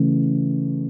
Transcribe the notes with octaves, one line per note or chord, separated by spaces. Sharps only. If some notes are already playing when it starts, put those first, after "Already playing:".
Already playing: C#3 E3 A3